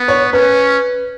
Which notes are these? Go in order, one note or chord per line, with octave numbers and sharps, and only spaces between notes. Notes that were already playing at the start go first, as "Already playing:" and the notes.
Already playing: B3
C#5
C#4 B4